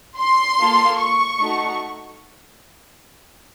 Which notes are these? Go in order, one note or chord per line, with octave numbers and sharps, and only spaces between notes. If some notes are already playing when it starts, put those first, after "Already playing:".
C6
A#3 F4 A4
C#6
A3 D#4 F#4